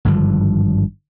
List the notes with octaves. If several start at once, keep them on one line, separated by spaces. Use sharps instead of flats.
G#1 G2 D3 F3